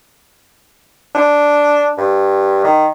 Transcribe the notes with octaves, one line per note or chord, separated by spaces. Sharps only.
D4
G2
D#3